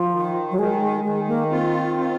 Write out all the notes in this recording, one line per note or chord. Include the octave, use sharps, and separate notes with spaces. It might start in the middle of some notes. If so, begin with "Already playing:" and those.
Already playing: F3
D#3
F#3
D#3 G#3
G#3
D#3 G#3
A#3
C4 F4
F4